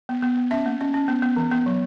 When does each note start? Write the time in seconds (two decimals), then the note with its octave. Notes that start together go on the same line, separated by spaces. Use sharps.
0.09 B3
0.22 B3
0.37 B3
0.51 C#4 E5
0.66 A#3
0.81 C#4
0.94 C#4
1.08 B3
1.22 B3
1.36 E3
1.51 B3
1.66 F#3